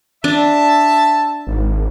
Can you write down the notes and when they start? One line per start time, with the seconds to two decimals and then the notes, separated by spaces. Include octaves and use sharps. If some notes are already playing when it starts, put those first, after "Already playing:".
0.24 D4 E5 A5
1.47 G#1